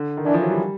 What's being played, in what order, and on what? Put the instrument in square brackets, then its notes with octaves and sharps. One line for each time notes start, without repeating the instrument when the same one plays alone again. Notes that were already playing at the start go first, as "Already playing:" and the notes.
Already playing: [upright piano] D3
D#3
[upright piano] E3 [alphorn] D4
[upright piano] F3
F#3
G3